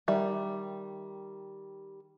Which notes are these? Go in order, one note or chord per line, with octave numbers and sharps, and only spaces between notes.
D#3 G3 E5